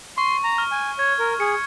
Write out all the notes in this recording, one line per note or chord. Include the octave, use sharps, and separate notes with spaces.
C6 C#6
A#5
F6
G#5
C#5 G#6
A#4
G#4 C#7